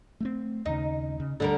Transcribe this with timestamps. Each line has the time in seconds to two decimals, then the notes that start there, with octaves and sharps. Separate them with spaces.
0.20 A3 A#3 C4
0.66 D#2 C#3 D#4
1.20 C#3
1.40 D2 D3 G3 A#4